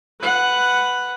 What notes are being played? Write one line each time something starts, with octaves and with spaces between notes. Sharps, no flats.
B4 F#5